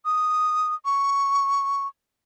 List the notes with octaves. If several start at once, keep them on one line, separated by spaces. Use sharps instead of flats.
D#6
C#6